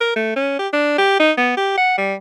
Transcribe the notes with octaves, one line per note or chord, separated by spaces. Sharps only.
A#4
A3
C#4
G4
D4
G4
D#4
B3
G4
F#5
G3